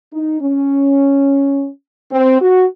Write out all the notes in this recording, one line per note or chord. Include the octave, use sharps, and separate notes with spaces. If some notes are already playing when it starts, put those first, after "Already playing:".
D#4
C#4
C4
F#4